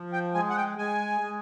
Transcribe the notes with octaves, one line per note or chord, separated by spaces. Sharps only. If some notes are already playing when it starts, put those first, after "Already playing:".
Already playing: F3
G5
G#3 G#5
F#5
G5
G#3 G#5
G#3